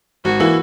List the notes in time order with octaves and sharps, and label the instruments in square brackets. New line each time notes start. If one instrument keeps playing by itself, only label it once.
[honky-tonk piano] G#1 [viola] F#4
[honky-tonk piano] E3 A#3 E4